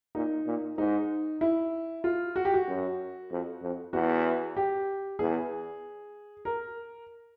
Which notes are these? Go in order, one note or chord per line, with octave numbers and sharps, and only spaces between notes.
A#2 D#4
A#2
G#2 D#4
E4
F4
F#4
G4
F#4
F#2
F2
F2
E2 F#4
G4
E2 G#4
A#4